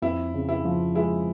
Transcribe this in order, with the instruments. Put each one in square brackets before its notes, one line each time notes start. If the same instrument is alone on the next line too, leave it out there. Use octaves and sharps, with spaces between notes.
[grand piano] F2 [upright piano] E4
[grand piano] C#3
[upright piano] E4
[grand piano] F3
[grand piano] G#3 [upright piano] E4